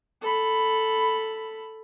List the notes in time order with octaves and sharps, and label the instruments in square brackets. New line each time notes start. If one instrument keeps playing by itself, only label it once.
[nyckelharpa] A4 B5